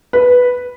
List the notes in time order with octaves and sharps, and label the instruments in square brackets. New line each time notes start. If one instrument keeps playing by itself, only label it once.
[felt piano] B4